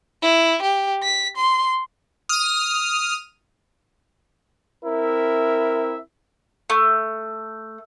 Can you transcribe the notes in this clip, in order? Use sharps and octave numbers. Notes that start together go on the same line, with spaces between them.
E4
G4
B6
C6
D#6 F6
C4 E4 A#4 E5
A3